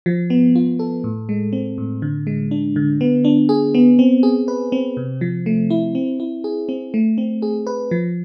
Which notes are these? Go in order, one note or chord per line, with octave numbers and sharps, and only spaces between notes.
F3
B3
F4
A4
A2
G#3
C4
A2
D3
G#3
D4
D3
B3
D4
G#4
B3
C4
G#4
B4
C4
C3
F3
A3
E4
C4
E4
G#4
C4
A3
C4
G#4
B4
F3